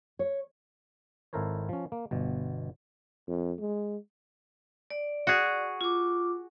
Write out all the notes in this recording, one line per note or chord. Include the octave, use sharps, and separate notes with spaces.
C#5
G#1 E4 A4 A#4 C5 C#5
F3 C#4
A#3
G1 B2
F2
G#3
D5
F#4 G#4
F4 D6